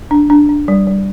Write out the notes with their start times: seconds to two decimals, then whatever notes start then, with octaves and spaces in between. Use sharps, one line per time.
0.11 D4
0.30 D4
0.49 D4
0.68 G3
0.87 G3